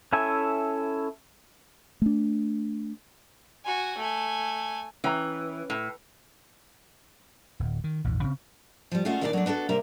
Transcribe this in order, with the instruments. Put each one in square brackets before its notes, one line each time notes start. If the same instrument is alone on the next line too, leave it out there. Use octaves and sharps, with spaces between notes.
[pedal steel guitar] C#4 E4 A4 E5 G#5
[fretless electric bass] A3 D4
[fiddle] F#4 G#5
A3 G#5
[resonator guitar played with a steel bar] E3 [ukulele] C#4 G5 A#5
[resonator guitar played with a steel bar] A2
[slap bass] D1
D#3
A#1 E2 G#2
C#3 C4
[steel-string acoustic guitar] F3 G3
G#3 A3 C#4 F4 F#4
D#2 A#2 D4 D#4 F#4 D5
F#3 A3 D4
B3 D4 F#4 A4
C3 G3 A#3 E5 A#5